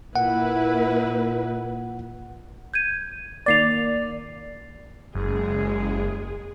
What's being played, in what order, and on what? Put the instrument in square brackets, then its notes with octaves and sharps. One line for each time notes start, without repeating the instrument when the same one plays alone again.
[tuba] A#2 [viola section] A#3 E4 B4 [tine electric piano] F#5
[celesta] G6 G#6 D#7
[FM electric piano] D#3 A#3 D5 [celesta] A6 C7 F7
[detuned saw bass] F#1 [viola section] G#3 G#4